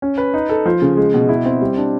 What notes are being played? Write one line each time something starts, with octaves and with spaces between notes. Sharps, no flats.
C#4
B4
D#4
A4
F3
C#3
G#3
B2
E4
C4
G3
D4